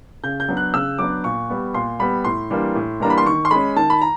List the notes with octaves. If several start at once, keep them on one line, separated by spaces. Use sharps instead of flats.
C#3 G6
G6
F#3 B3 D4
F#6
C#3 E6
F#3 B3 D4 D6
A#2 C#6
G3 B3
A#2 C6
G3 B3 B5
A2 C6
E3 G3 A#3 D4
A2
E3 G3 A#3 D4 A#5
B5
C6
D#3 C#6
C6
G#3 C#4 B5
D#3 A5
B5
A#5